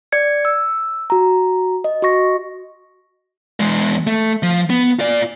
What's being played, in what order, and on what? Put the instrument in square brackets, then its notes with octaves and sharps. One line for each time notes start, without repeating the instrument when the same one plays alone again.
[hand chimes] D5 G#6 C#7
E6
F#4 A#5
D#5
F#4 D#5 C#6 A#6
[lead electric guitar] E2 G#3
A3
F3
B3
F4 D5